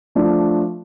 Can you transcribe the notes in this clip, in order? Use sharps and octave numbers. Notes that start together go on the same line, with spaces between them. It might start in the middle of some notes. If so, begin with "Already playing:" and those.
F3 A3 D4